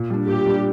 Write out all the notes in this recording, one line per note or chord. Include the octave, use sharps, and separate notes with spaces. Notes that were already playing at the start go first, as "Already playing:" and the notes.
Already playing: A#2
G3 D4
A#2 G4
G3 D4